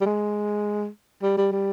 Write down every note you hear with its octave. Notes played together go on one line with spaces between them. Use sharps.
G3
G#3
G3
G3
G3